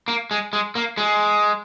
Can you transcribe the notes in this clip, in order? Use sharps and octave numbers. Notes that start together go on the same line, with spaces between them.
A#3
G#3
G#3
A#3
G#3